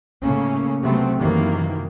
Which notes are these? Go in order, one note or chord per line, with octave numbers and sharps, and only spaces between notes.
A2 C#3 A3 A#3 C#4
C3 F#3 A3 B3 C4
F#2 C3 D#3 E3 F#3 A#3